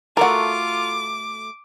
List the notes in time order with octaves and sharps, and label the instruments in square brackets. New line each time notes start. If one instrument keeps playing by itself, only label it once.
[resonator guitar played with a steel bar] A3 F#4 A4 [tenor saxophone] F4 [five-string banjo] A#4 F#5 [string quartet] D6